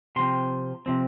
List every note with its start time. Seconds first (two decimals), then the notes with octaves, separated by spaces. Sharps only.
0.16 C3 F3 C4 C6
0.86 C3 F3 C4